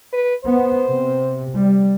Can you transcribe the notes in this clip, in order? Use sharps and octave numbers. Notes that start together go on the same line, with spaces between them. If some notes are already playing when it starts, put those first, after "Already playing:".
B4
B3 C5
C3
G3